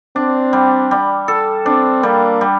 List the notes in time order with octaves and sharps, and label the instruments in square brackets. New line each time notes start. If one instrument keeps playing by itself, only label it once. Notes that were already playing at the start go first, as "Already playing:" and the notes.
[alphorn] C4 [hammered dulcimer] D4
[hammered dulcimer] G3
G3
A4
[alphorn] C4 [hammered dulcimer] D4
[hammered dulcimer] G3 [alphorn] A#3
[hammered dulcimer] G3